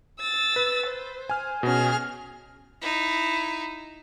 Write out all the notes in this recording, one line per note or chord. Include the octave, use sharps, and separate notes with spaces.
E6 A6
B4
C5
G#5 F6
B2 C#4 G#4 F6
D#4 E4